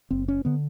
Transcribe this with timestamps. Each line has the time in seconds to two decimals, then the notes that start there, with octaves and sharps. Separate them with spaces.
0.11 F#1 C4
0.28 C#4
0.45 D3 B3